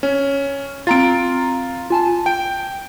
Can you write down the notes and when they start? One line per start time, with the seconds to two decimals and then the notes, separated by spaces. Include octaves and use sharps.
0.03 C#4
0.87 C4 F4 A#5 A6 D7
1.90 F4 G#5 A5
2.26 G5 D7